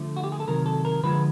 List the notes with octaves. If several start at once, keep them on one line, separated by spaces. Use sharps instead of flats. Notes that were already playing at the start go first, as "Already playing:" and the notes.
Already playing: D3 F3 A3
F#4
G4
G#4
A4
C3 D#3 F#3 A#4
A4
A#4
D3 F3 G#3 B4